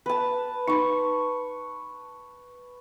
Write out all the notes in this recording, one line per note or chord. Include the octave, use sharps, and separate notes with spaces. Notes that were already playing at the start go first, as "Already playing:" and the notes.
B4 A5
D#4 B5 C#6